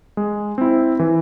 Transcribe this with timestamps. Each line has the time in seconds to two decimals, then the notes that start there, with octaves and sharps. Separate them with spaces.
0.17 G#3
0.58 C4 E4
0.99 E3